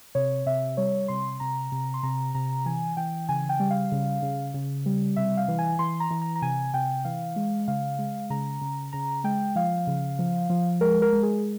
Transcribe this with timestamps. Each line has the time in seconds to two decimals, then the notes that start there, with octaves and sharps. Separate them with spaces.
0.15 C3 C#5
0.46 C3 E5
0.77 G3 C#5
1.08 C3 C6
1.40 C3 A#5
1.72 C3
1.94 C6
2.03 C3 A#5
2.35 C3 A#5
2.66 E3 G#5
2.97 E3 G5
3.29 C#3 G#5
3.49 G5
3.60 G3
3.70 F5
3.92 C#3
4.22 C#3
4.54 C#3
4.86 G3
5.16 C3 E5
5.37 F5
5.48 E3
5.59 G#5
5.79 E3 C6
6.00 A#5
6.11 E3
6.22 A#5
6.36 A#5
6.42 C3 G#5
6.74 C3 G5
7.05 E3 F5
7.36 G#3
7.68 C#3 F5
7.99 G#3
8.30 C#3 A#5
8.61 C#3
8.93 C#3 A#5
9.24 G#3 G5
9.56 F3 F5
9.87 C#3
10.19 F3
10.50 F3
10.81 G#3 A#4
11.02 A#4
11.13 G#3
11.23 G#4